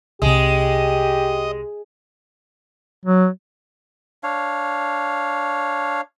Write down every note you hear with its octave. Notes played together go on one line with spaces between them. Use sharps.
C2 C3 G#3 G4 D#5
F#3
D4 C#5 F5